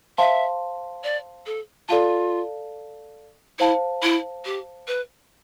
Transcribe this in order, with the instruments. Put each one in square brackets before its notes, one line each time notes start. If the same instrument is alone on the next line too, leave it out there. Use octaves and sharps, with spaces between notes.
[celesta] C5 F5 A5 C6 [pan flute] E5
[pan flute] D5
A4
[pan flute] F4 [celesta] A4 D5 F5 A5
[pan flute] E4 [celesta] C5 F5 A5
[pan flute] E4
G4
B4